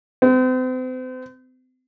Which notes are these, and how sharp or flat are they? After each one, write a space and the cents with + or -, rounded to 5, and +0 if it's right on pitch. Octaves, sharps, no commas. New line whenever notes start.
C4 -40